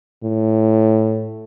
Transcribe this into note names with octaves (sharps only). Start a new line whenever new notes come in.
A2